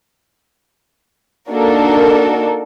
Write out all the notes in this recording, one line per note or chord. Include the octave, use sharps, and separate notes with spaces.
A#3 D4 D#4 F#4 A4 A#4